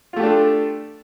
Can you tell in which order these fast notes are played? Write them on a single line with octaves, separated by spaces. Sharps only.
F4 A3 G4 D4 A4